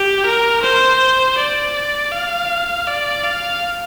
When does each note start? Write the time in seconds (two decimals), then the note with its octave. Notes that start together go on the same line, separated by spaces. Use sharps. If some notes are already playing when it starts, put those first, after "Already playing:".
Already playing: G4
0.26 A#4
0.63 C5
1.38 D5
2.12 F5
2.87 D5
3.24 F5